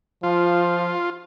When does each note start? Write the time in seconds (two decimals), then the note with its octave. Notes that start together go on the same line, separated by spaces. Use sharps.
0.23 F3 F4